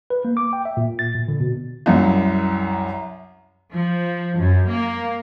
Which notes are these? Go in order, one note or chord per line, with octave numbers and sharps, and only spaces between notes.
B4
A#3
D6
G5
E5
A#2
A6
A#2
D3
B2
C2 F#2
F3
F#2
A#3